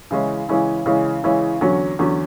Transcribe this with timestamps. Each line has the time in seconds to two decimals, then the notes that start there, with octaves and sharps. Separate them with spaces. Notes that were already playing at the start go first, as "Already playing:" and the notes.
0.11 C#3 E3 G#3 C#4 E4
0.49 C#3 E3 G#3 C#4 E4
0.86 C#3 E3 G#3 C#4 E4
1.24 C#3 E3 G#3 C#4 E4
1.61 E2 D3 F#3 C#4
1.99 E2 D3 F#3 C#4